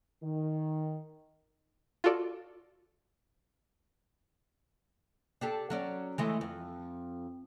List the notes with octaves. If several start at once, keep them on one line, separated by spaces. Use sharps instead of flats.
D#3
F4 F#4 A4 D5
D4 G4 A4
F#3 C#4 D5
E3 G#3 A3
F2